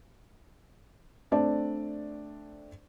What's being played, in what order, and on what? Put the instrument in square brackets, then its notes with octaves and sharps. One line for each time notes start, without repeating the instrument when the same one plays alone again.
[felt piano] A3 C4 D4 D5 A5